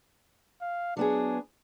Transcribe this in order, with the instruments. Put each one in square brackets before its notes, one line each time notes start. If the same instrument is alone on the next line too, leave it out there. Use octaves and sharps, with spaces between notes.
[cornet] F5
[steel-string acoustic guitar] F#3 B3 G#4 [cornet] D4